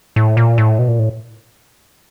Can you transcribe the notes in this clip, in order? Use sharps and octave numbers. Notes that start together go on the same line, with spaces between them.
A2
A#2
A2
B2
A#2
A2